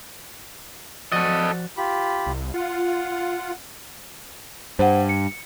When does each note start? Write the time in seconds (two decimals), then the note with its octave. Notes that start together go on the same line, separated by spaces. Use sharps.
1.12 F3 F#4 A4 D5 D#5
1.77 F4 G4 B5
2.27 C2
2.54 F4 F#5
4.79 G2 C5 F#5
5.09 C#7